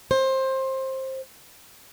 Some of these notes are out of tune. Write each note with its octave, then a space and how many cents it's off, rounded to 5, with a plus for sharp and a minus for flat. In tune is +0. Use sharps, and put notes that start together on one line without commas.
C5 +20